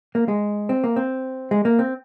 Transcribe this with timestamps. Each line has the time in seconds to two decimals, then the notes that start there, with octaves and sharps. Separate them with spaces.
0.15 A#3
0.28 G#3
0.69 C4
0.84 A#3
0.96 C4
1.51 G#3
1.65 A#3
1.79 C4